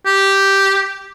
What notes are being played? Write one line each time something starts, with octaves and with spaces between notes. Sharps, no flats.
G4